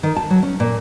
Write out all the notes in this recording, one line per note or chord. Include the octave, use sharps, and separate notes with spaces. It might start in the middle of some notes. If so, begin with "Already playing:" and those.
D#3
A5
F#3
C#4
A#2